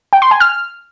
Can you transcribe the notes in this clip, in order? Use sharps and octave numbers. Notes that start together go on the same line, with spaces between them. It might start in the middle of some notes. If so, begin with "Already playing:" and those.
G5
C6
G#5
F6